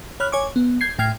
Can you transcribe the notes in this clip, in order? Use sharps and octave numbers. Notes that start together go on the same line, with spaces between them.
C#5 B5 F6 F#6
C#5 G#5 C#6 D6
B3
G6 G#6 C7
A2 G5 F6 G#6 C7